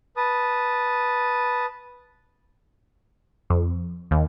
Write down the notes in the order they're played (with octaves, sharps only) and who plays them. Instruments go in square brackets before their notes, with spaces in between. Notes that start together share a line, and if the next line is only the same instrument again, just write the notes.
[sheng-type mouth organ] B4 A5 D#6
[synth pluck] F2
D#2